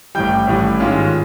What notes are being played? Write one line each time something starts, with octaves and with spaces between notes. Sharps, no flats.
A1 A2 E3 G3 G5 G6
A1 A2 E3 G3
G#2 D#3 G#3 C#4 F4